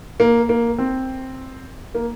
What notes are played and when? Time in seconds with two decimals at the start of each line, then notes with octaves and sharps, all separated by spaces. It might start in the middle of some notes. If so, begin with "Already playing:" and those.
0.20 A#3
0.49 A#3
0.78 C4
1.95 A#3